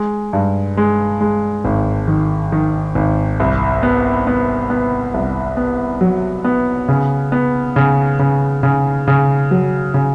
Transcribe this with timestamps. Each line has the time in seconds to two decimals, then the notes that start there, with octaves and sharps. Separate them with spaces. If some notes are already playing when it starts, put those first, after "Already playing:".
Already playing: G#3
0.33 G2
0.77 G#3
1.21 G#3
1.65 G#1
2.08 D#3
2.52 D#3
2.95 G#1
3.40 C2
3.83 B3
4.27 B3
4.70 B3
5.14 C2
5.57 B3
6.01 F#3
6.44 B3
6.88 C#3
7.32 B3
7.76 C#3
8.19 C#3
8.63 C#3
9.08 C#3
9.51 F#3
9.94 C#3